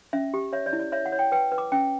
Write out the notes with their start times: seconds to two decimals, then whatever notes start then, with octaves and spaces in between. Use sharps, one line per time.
0.13 C#4 E5
0.34 G4
0.53 C#5 E5
0.66 D5
0.73 E4
0.79 D5
0.92 C#5 E5
1.06 F#5
1.12 C#5
1.19 G5
1.32 B4 G5
1.52 B4
1.58 D6
1.72 C#4 G5